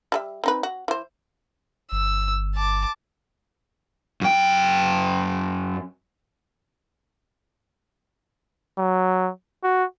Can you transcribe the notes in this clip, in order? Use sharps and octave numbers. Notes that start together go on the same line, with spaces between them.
G3 A4 E5
C4 D#4 B4
F#4
E3 C5
G1 E6
A5 D6
F#2 G5
F#3
F#4